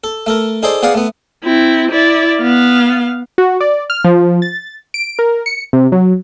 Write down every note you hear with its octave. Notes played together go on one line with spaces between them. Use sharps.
A4
A3 A4 A#4
D#4 G#4 A4 C5 D5
B3 G#4 D5 F5 F#5
A3 B3
C4 E4
E4 D5
B3 F5
F#4
D5
F6
F3
A6
D7
A#4
C#7
C3
F#3